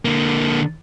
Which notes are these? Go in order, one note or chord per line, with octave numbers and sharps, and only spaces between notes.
D3 A#3